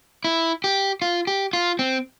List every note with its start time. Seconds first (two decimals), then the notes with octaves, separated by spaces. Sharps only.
0.24 E4
0.64 G4
1.02 F4
1.27 G4
1.53 F4
1.79 C4